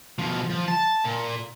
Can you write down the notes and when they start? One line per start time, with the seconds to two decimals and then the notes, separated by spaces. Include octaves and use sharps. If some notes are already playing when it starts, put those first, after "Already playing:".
0.19 B2 F3
0.50 F3
0.68 A5
1.05 A#2